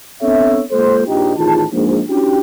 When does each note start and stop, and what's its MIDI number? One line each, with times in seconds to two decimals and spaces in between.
0.22 0.61 59
0.22 0.61 60
0.22 0.61 62
0.22 0.61 69
0.22 0.61 73
0.22 0.61 76
0.71 1.06 56
0.71 1.06 58
0.71 1.06 65
0.71 1.06 69
0.71 1.06 72
1.06 1.33 34
1.06 1.33 63
1.06 1.33 67
1.38 1.63 33
1.38 1.63 51
1.38 1.63 65
1.38 1.63 68
1.38 1.63 81
1.72 2.00 34
1.72 2.00 44
2.07 2.39 61
2.07 2.39 62
2.07 2.39 64
2.07 2.39 66
2.07 2.39 67